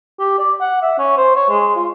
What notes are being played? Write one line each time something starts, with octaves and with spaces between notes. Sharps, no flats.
G4
D5
F#5
E5
C#4
C5
C#5
G#3
F4